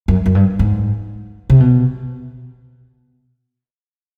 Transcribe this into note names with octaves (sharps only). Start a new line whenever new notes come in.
F#2
F#2
G2
G#2
C3
B2